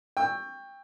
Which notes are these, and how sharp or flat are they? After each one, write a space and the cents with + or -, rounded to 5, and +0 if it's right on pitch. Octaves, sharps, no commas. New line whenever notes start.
G5 +20 C#6 +0 E6 +0